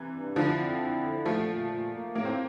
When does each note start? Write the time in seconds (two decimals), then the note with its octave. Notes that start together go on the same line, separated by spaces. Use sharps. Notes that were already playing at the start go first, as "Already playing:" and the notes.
Already playing: C3 E3
0.14 G2
0.36 D3 F3 E4
0.59 C4
0.80 E4
1.03 D3
1.26 A#2 F3 A3
1.49 A#2
1.71 A#2
1.93 A#3
2.15 A2 A#3
2.25 C4